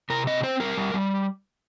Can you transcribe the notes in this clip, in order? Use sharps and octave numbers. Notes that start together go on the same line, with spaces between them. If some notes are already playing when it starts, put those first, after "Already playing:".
C3 A#4
C4 D#5
C4 C5
G3 A#4
G3
G3